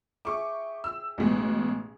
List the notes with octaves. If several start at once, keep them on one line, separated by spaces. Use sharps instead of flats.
G#4 E5 G5 C#6 D6
E6
A1 B2 G#3